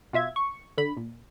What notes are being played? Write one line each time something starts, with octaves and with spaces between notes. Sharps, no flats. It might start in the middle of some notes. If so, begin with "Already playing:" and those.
B2 F4 E5 G#6
C#6
D3 B5
A#2